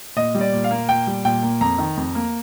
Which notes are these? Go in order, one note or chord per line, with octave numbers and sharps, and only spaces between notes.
A#2 D#5
G3
D5
A#2
F5
A#3
A#2 G5
G3
A#2 G5
A#3
F2 A#5
D#3
F2
A#3